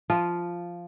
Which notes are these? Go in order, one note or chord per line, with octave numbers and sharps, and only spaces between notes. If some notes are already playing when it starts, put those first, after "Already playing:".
F3 F4